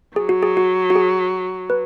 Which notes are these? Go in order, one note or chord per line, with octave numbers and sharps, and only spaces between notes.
F#3 G#4
F#4
G#4
F#4
F#4
G#4
B4